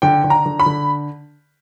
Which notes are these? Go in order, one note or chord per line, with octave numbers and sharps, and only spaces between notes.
D3 G5
D3
A#5
D3
B5
D3